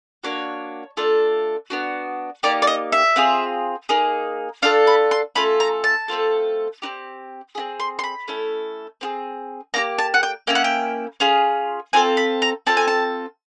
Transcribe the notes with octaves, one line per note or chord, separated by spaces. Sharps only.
A#3 D4 F#4 C#5
A3 D4 F4 A4
B3 D4 F#4
A#3 D#4 G4 D5
D5
D#5
E5
C4 F4 G#4
A#3 D#4 G#4
D4 F4 A4 F5
B5
C6
A3 C#4 F4 A4 B5
A#5
A5
A3 C4 F4 A4
C4 D#4 G4
C4 E4 G#4
C6
C6
B5
A3 C#4 E4 A4
C4 F4 G#4
A#3 D4 G4 A#5
A5
F#5
G5
A#3 C#4 E4 G5
F#5
G5
C#4 F4 G#4
C4 F4 A4 G#5
B5
A#5
C4 F4 A4 A5
G#5
A5